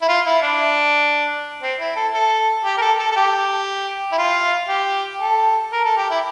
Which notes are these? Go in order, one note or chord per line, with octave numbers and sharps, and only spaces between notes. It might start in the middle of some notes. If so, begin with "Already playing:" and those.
E4
F4
E4
D4
C4
E4
A4
A4
G4
A#4
A4
A4
A4
G4
E4
F4
G4
A4
A#4
A4
G4
E4